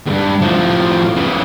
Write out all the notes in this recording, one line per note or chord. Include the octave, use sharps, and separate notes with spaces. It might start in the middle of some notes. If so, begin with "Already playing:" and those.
E2 G2
A2 F3
C#3 E3